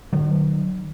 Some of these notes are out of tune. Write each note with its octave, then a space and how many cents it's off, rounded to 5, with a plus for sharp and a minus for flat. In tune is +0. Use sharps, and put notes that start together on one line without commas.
D#3 -45 F#3 +0